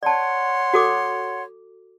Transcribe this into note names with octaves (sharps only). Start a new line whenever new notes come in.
C#5 D5 F#5 A5 C6
F#4 A4 D6